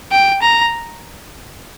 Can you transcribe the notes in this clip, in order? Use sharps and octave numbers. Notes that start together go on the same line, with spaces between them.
G5
A#5